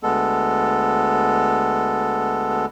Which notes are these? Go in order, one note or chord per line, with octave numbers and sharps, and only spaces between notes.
D2 G#3 B3 A4